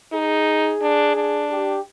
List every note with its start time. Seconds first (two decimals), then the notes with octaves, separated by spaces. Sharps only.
0.12 D#4 G#4
0.81 D4
1.16 D4
1.50 G4